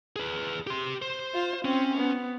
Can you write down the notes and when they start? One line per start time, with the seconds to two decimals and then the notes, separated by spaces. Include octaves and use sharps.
0.16 G#4 B4
0.67 G4 C6
1.02 C5
1.34 F4
1.65 C4 C#4
1.98 B3